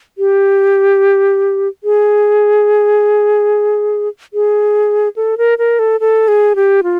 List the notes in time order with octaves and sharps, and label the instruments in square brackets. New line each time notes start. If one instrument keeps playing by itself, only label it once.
[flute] G4
G#4
G#4
A4
A#4
A#4
A4
A4
G#4
G4
F4